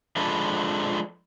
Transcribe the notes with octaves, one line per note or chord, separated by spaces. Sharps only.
F3 G#3 D4 A4 B4